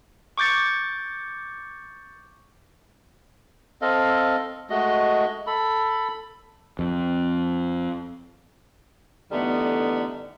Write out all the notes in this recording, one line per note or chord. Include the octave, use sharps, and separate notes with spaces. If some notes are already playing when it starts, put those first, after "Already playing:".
C#6 D6 G6 A6 C#7
C4 A4 D#5 F5
G#3 A3 F#4 D#5
A4 B5
F2
D3 E3 G3 A3 B3 D#4